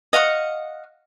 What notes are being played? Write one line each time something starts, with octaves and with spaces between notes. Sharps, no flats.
D#5 F5 F#5 C#6